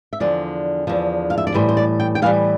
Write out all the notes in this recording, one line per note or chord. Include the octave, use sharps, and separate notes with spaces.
E5
E2 D3 F3 D5
E2 D3 F3
F5
E5
D5
A2 E3 G3 C5
C5
D5
G5
G5
A2 E3 G3 F5